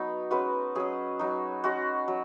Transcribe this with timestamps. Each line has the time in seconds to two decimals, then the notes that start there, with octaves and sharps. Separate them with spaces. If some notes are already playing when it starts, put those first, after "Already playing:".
Already playing: F#3 B3 D#4
0.31 G#3 C#4 F#4 B4
0.75 F#3 C#4 G#4
1.19 F#3 D#4
1.64 G#3 C#4 F#4
2.08 F#3